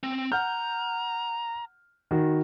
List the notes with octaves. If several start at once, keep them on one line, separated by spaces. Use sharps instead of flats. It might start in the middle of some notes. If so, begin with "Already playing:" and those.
C4
F#5 A#5 F6 G6
D#3 F#4